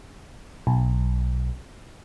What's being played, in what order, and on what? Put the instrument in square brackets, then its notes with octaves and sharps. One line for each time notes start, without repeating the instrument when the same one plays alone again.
[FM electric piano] B1